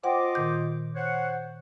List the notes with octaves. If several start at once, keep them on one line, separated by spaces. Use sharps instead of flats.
F4 C5 D#5 F#5 G5 D6
A#2 D#3 G6
C5 C#5 F#5